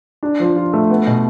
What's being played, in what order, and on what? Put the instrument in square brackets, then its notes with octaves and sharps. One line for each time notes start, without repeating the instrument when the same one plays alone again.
[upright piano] D4
F3
F4
A3
B3
B2